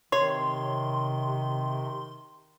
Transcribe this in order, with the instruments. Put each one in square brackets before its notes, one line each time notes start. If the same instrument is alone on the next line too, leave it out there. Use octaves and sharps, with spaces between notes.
[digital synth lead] C3 [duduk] D#3 [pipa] C#5 [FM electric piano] C6